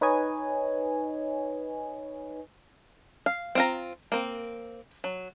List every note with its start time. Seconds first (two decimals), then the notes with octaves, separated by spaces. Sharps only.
0.01 D#4 B4 C#5 D#5 G#5
3.26 F5
3.55 C4 F4 A#5
4.12 A#3 C4
5.04 F#3